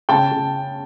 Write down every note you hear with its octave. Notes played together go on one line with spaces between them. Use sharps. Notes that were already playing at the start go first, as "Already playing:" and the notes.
C#3 G5 A5
C#3